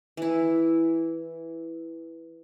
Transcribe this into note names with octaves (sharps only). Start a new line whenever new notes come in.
E3 E4